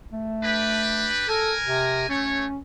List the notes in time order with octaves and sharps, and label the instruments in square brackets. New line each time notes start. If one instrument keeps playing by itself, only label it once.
[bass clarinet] A3
[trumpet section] D4 G4 B4
[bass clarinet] A4 [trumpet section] A#4 G#5
[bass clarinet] C3
[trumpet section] A3 C#5 [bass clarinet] C#4